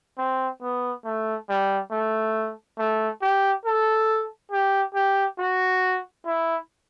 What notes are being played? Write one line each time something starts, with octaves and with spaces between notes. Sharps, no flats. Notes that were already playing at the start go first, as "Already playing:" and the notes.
C4
B3
A3
G3
A3
A3
G4
A4
G4
G4
F#4
E4